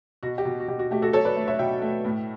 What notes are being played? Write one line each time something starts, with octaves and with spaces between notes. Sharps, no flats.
B2 F#4
G4
B2
F#4
B2 G4
F#4
A3 G4
F#4 A4
F#3 A4 C#5
B4 D5
A3
C#5 E5
B2 E5 G5
A3
A2